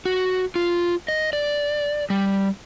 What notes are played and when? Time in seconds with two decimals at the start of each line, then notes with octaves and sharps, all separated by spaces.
0.05 F#4
0.56 F4
1.08 D#5
1.33 D5
2.10 G3